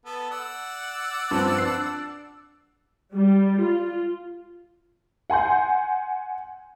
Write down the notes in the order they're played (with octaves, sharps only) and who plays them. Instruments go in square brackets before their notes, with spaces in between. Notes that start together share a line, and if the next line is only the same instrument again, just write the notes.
[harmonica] B3 A4
D5 F#5 E6
[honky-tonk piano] G2 F3 C4
D4 C7
[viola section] G3
F4
[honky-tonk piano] F#5 G#5 C6 G6